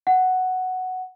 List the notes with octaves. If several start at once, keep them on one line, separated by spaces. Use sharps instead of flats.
F#5